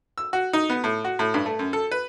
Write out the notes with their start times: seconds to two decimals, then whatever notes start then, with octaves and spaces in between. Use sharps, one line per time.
0.18 E6
0.33 F#4
0.53 D#4
0.70 B3
0.84 A2
1.04 F#4
1.19 A2
1.34 G2
1.46 A3
1.59 F#2
1.73 A4
1.91 B4